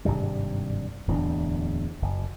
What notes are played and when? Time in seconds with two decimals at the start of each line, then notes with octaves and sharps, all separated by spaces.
0.05 G#1 G2 C3 G3
1.08 D1 E2 F3 D4
2.02 F#1